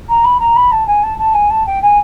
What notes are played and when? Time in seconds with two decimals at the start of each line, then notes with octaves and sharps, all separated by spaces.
0.09 A#5
0.24 B5
0.40 A#5
0.56 B5
0.72 A5
0.87 G#5
1.03 A5
1.18 A5
1.34 G#5
1.50 A5
1.66 G5
1.82 G#5